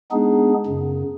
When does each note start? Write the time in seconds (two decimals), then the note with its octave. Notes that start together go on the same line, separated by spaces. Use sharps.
0.12 G#3 B3 D4 D#4 G#4
0.66 F#2 C#3